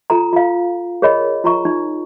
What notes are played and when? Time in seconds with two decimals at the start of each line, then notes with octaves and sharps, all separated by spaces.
0.10 F4 A4 A#5
0.33 F4 F5
1.02 G#4 A#4 C#5 D#5 B5
1.44 F4 A#5 C#6
1.65 D#4